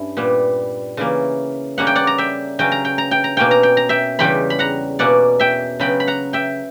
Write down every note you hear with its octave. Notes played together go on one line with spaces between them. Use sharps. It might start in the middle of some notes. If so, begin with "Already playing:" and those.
Already playing: G2 C#4 E4
A#2 G3 B3
C#3 E3 A#3
C#3 G3 A#3 C#4 F#5
G5
D5 F#5
A#5
E5 G5
C#3 F#3 C#4 G5
A#5
G5
A#5
G5
A#5
B2 A#3 C#4 G5
A#5
G5
A#5
E5 G5
E2 C#3 G3 G5 B5
B5
F#5 A#5
B2 A#3 C#4 D5 F#5
E5 G5
C#3 F#3 B3 G5 B5
B5
F#5 A#5
E5 G5